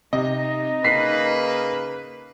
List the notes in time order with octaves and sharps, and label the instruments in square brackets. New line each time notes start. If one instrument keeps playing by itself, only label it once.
[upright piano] C3 [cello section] D#4 [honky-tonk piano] D#5
[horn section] C#3 A#3 B4 [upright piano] B6 C7